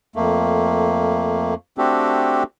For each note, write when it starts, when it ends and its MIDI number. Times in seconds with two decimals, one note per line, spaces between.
0.16 1.54 41
0.16 1.54 57
0.16 1.54 58
1.78 2.43 57
1.78 2.43 60
1.78 2.43 62
1.78 2.43 66
1.78 2.43 67
1.78 2.43 69